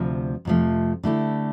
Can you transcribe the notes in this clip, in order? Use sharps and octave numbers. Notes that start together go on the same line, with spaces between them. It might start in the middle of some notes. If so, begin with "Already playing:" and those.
Already playing: D2 C3 F3
F2 C3 F3 A3
D3 A3 E4 G4